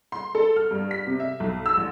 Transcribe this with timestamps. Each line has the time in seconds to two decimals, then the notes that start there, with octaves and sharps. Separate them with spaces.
0.12 C6
0.35 A4
0.56 F6
0.71 G2
0.91 B6
1.07 C3
1.20 E5
1.40 B1
1.66 E6
1.77 A1